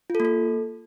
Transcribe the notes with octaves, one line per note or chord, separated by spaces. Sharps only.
F4
A4
A#3
A4